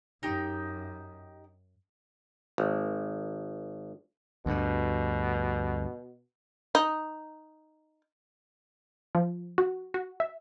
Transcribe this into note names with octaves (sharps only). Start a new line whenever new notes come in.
F#2 D#4 G4
G#1
D2 G2 B2
D#4
F3
F#4
F#4
E5